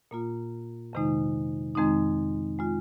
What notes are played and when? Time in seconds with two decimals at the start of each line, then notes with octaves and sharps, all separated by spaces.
0.11 A#2 A#3 F4
0.93 F2 C3 D#3 G#3 D#4
1.75 F2 D#3 G#3 C4 D#4
2.59 G#3 F4